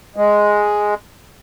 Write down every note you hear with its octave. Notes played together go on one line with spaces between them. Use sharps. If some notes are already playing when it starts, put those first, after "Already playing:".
G#3